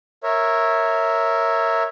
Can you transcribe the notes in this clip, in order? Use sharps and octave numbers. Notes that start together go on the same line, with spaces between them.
A#4 C#5 E5